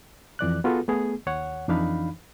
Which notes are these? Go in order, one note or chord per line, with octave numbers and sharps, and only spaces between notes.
F2 E3 D5 F#6
B3 F4 F#4 G#4 A4 B4
A3 B3 G#4
D#2 C#5 F#5
F2 E3 D4 D#4 F5 B5